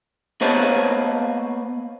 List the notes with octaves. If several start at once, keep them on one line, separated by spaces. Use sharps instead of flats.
A#3 B3 C5 C#5 D#5 A5